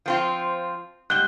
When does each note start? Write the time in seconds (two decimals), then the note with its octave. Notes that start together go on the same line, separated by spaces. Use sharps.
0.06 F3 C4 F4
1.10 G#2 G3 F#6 G7